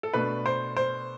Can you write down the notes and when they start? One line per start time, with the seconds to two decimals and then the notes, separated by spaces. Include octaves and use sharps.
0.03 A4
0.14 B2 A3 D4 B4
0.46 C5
0.77 C5